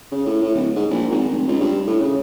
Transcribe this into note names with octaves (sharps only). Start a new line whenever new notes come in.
C#3
A2
A2
D1
G#2
A#1
G#1
F1
C#2
G2
A2
C#3